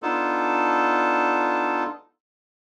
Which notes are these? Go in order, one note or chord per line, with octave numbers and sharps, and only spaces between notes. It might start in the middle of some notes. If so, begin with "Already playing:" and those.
B3 D4 D#4 F4 A4